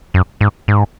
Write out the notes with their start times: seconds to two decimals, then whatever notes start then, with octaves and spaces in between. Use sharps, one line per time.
0.14 F#2
0.41 G#2
0.68 G#2